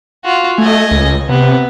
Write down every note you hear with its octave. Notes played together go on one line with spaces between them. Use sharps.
F4 F#4
A3 D#5 G#5
C#2
C3 B3